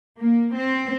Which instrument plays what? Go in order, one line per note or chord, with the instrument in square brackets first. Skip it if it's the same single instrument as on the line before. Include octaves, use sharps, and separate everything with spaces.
[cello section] A#3
C4